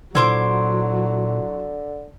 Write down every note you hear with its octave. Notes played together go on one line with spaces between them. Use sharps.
A#2 D3 F#3 E4 C5 D6